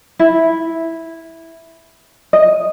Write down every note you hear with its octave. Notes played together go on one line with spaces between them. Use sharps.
E4
D#5